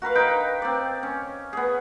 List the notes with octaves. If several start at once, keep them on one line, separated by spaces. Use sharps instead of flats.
F#4 A#4 B4 F5
D#4 B4 G5
C4 D5
C#4
B3 G#4